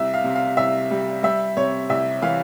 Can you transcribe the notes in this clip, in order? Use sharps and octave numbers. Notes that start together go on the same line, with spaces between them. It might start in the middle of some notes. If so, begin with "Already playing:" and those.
Already playing: C2 E5
F5
C3
F5
C2 E5
G3
G3 E5
C3 C#5
C2 E5
E3 F5